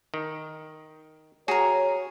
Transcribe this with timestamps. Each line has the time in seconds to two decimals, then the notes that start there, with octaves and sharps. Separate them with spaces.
0.14 D#3
1.48 F#4 G#4 A#4 C#5